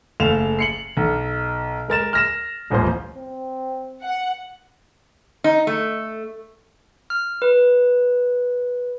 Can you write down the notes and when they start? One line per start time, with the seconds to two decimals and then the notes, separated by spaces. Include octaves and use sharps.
0.20 F#1 A3 F5 E7 F7
0.59 C7 C#7 F#7
0.97 B1
1.88 G#3 A#4 A6 E7
2.13 F6 A#6 E7
2.70 D#1 A1 F3 C4 C5
3.14 C4
4.04 F#5
5.44 D#4
5.67 A3
7.10 F6
7.42 B4